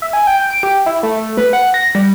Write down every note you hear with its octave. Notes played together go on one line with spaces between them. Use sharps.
E5
G#5
G5
D7
G4
E4
A3
A3
B4
F#5
A#6
G3